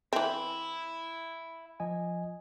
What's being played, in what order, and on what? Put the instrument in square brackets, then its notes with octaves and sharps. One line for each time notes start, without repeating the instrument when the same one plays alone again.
[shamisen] E3 C4 [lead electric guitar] E5 B5
[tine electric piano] F3 D#5 G#5